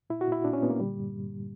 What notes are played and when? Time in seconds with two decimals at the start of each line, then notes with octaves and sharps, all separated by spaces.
0.10 A#2 E4
0.21 F#4
0.28 A#2 E4
0.44 A#2 D4
0.53 C#4
0.62 A#2 B3
0.70 A#3
0.80 D3 G3
0.97 G2
1.14 G2